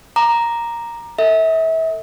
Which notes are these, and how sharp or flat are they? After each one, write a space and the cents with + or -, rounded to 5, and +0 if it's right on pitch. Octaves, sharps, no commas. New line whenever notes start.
A#5 +0 D6 +30
A4 +35 E5 -30